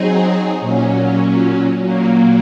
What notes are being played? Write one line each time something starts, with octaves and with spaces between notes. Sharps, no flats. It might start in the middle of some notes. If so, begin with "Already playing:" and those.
Already playing: F#3 C4 D#4 G#4
A#2 F#3 C#4
A#2 F#3 A#3